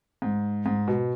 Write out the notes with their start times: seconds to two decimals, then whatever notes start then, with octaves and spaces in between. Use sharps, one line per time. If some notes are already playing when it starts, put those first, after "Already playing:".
0.22 G#2
0.66 G#2
0.88 B2